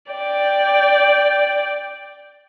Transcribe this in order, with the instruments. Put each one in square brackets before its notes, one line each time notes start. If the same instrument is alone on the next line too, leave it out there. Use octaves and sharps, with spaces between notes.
[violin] D5 G5